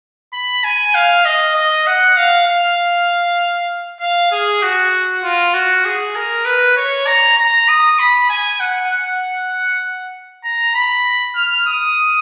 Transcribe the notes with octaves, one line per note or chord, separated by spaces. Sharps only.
B5
G#5
F5
D#5
D#5
F#5
F5
F5
F5
G#4
F#4
F4
F#4
G#4
A#4
B4
C#5
A#5
A#5
D#6
B5
G#5
F#5
F#5
A#5
B5
F6
D#6